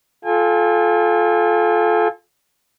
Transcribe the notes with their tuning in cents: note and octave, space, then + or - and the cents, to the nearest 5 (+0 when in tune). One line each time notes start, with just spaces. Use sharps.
F4 +5 A4 -25 G#5 -40